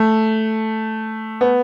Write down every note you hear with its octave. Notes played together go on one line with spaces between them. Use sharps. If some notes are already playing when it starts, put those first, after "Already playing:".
Already playing: A3
B3